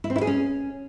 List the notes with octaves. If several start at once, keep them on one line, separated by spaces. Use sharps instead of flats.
E4
C4
E4
G#4
C#4